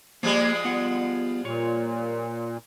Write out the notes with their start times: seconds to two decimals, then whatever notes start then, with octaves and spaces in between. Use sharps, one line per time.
0.23 F3 G3 G#3 A#3 G4 G#4
0.65 B3 F4 F#5
1.45 A#2 F4 C#5